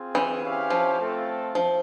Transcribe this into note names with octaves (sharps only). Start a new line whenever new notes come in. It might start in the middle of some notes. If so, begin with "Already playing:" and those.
Already playing: C4 F4 G#4
E3
C#4 E4 G4 C5 F5
F3
A3 C4 F4 A4
F3